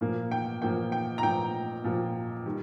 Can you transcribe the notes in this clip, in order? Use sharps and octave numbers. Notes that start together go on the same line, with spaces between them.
A#2 F3 A#3
G5
A#2 F3 A#3 G5
G5
A#5
A#2 F3 A#3 G5
A#2 F3 A#3
D#3 G3